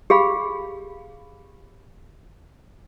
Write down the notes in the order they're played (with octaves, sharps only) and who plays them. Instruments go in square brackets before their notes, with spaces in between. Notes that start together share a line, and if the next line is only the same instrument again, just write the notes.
[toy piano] G4 G#4 F5 B5